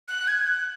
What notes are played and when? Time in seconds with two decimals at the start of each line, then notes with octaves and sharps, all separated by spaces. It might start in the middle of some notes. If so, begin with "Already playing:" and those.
0.08 F#6
0.28 G#6
0.47 F#6